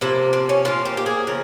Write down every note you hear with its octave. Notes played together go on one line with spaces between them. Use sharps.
C3 F3 A#3 E4
C4
C#4
A#2 F3 A#3 F4
G4
G4
G#4
C#3 F3 A#4